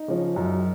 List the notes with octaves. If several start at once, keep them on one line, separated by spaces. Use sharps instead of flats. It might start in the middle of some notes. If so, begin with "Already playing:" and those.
Already playing: D#4
C#3 F3
F#2